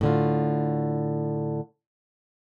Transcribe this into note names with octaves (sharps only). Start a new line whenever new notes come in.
A2 D3 F4